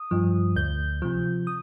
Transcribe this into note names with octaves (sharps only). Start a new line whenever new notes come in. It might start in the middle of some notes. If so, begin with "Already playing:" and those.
Already playing: D#6
G2 F3
D2 G6
C3 F3
D#6